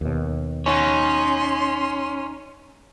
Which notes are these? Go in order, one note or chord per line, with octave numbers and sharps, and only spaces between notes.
D#2 B2
C#4 D#4 C#5 C6